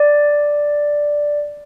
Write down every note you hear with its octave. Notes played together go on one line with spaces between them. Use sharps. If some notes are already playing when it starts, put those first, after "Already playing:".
Already playing: D5